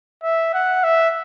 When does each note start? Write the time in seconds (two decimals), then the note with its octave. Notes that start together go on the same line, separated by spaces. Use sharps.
0.23 E5
0.54 F#5
0.84 E5